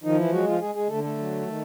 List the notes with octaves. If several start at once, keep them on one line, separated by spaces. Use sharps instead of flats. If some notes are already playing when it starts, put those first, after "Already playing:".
D#3 F3 D#4
E3 E4
F#3 G#3 F#4
F3 F4
G#3 G#4
G#3 G#4
D3 A3 A4
A3 A4
F#3
D#3